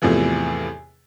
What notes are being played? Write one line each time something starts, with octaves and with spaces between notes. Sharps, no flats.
E2 A2 C3 E3 F3